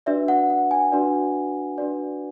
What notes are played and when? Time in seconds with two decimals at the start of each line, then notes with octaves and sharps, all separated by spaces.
0.06 D4 F#4 B4 D5 E5
0.28 F#5
0.50 F#5
0.71 G#5
0.92 D4 F#4 B4 D5
1.78 D4 F#4 B4 D5